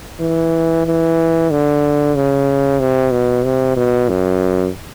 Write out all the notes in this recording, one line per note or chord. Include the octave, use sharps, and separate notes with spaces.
E3
E3
D3
C#3
C3
B2
C3
B2
F#2